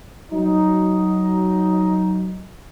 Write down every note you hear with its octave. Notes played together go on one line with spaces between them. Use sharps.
F#3 D#4